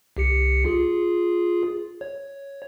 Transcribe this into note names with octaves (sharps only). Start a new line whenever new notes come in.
C2 G4 C#7
F4 G#4
C#5